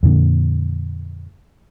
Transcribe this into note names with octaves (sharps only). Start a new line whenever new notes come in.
F2 A#2 D3